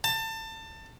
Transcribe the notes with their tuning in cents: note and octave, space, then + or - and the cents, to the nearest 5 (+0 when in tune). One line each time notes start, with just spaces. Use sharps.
A5 +25